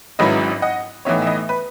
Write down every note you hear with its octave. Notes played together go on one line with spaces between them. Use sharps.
G#1 G#2 F#3 C#4 E4 B4 D#5
D#5 F#5
A2 E3 B3 D#4 C#5 E5
E5
B4 D#5
B4